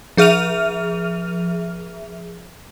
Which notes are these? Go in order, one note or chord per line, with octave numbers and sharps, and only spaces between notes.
F3 G#4 E5 F6 D#7 F7